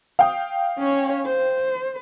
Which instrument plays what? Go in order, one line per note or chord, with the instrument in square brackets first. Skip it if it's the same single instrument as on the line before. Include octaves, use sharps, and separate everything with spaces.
[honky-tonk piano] F5 G5 D#6
[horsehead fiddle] C#4 C#5
C5